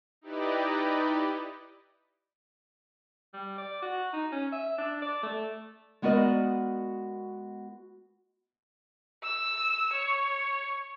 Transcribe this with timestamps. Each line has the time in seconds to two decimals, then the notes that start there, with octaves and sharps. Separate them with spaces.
0.21 D#4 E4 G4 B4 D5 D#5
3.33 G3
3.58 D5
3.82 F#4
4.13 D#4
4.32 C#4
4.52 E5
4.78 D4
5.02 D5
5.23 A3
6.02 G#3 B3 F#4 A#4 D5 D#5
9.23 E6
9.93 C#5